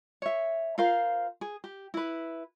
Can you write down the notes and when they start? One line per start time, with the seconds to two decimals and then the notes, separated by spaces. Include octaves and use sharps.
0.22 C#5 E5
0.78 F4 A#4 C5 F5
1.41 G#4
1.64 G4
1.94 E4 B4